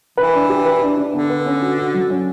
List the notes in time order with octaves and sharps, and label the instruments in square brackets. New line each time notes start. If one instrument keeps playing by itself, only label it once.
[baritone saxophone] E3 [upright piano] B4
[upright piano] D4
G4
B4
D4
D4
[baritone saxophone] D3 [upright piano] B3
[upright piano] B4
C#4
F#4
F#4
F#3
C#4